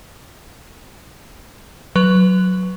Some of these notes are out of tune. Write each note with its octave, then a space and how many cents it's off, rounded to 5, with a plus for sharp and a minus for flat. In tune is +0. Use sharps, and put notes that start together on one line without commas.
F#3 +0 B4 +0